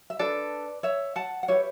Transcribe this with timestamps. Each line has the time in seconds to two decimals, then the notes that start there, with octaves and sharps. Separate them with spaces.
0.10 E5
0.19 D4 A4 B4 D5
0.83 C#5 E5
1.16 F#5 A5
1.43 F#5
1.48 E4 G4 B4 C#5 E5